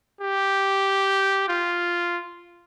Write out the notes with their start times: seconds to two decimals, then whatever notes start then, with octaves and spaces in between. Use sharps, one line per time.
0.21 G4
1.48 F4